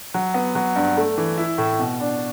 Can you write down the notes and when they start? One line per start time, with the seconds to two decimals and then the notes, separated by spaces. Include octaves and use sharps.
0.14 F#3
0.34 B3
0.55 F#3
0.76 G2
0.97 A3
1.17 E3
1.38 E4
1.58 A2
1.79 B2
2.00 D4